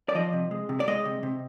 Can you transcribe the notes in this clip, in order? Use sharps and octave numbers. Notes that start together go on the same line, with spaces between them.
D5
F3 D#5
C3
G#3
C3
D5
G#3 D#5
C3
C3